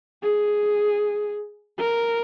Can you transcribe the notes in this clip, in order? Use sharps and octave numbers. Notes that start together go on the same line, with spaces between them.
G#4
A#4